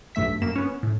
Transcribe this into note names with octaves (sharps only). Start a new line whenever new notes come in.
B1 G2 A3 E5 B6
F#2 A#3 E7
B3 C#4
A2